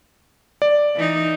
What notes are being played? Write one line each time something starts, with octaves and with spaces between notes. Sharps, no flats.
D5
E3 D#4